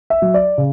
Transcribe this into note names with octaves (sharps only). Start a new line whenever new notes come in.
E5
F#3
D5
C#3